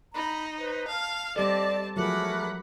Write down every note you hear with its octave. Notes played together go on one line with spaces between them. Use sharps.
D#4 A#5 B5
B4 C5
F5 A5 F6
G3 C4 G4 A4 D5 D#5 A5 D6
F3 F#3 A3 G#4 A#4 F#5 B5 D6